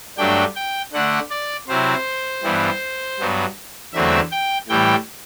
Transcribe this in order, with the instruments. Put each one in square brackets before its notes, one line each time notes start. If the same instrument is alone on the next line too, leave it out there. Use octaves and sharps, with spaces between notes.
[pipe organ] G2 F#3 A3 D4 G5
G5
D3 A3 D4 F#5
D5
C3 F#3 C4 E4 C5
G2 E3 G3 B3
G2 F#3 B3
E2 D3 F#3 A3 C4 E5
G5
A2 E3 G3 G5